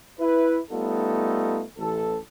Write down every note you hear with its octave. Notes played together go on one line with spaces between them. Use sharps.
E4 B4
G3 A3 B3 D#4 F4 A4
A1 A4